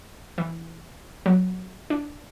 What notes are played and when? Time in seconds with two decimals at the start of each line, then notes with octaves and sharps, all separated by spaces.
0.38 E3
1.26 F#3
1.90 D4